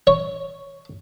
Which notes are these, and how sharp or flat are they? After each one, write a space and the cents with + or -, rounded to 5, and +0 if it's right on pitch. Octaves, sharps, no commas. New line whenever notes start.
C#5 +5